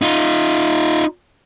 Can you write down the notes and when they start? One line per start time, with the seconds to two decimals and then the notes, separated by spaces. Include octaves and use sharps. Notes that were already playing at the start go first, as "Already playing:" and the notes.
0.02 D#4 F4